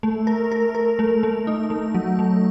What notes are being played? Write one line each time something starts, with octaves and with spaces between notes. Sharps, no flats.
A3
A#4
A#4
A#4
A3
A3
D#4
A3
F#3
A3